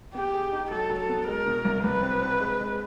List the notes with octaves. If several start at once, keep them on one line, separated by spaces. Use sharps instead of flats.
B3 G4
G#4
D#4
F#3 A4
F#3
A4
B3
G#3 A#4
B2
C2
C2 B4
C4
C4
G#3
G#3